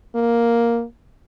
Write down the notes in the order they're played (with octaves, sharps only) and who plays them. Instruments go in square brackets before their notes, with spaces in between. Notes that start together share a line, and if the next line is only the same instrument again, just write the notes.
[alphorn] A#3